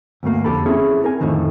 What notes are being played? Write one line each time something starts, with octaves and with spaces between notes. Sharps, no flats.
D2 G2 A3 A#3
F2 D3 G4 A4 B5
C4 C#4 E4 G#4
A#4 G#5
F2 A2 D3 D#3 F3